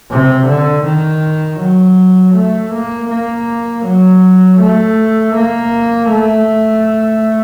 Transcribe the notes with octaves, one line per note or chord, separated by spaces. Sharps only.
C3
D3
D#3
F#3
A3
A#3
A#3
F#3
A3
A#3
A3